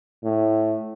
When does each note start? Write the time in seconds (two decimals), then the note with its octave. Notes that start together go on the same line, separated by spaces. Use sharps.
0.24 A2